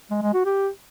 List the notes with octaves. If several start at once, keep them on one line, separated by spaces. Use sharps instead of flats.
G#3
G#3
F#4
G4